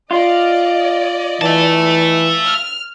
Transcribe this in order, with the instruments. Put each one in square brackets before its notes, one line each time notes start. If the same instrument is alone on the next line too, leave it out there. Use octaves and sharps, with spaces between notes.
[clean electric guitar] F4 [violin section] D5 D#5
[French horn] E3 [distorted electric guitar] E5 A5
[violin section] F6